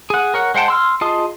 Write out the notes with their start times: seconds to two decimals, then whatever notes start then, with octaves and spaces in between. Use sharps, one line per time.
0.10 G#4 F#5
0.34 A#4 C#5 F#5
0.55 G#3 C5 F#5 G5 A5
0.68 C6 E6 F6
1.01 F4 G#4 D#5 A5 D#6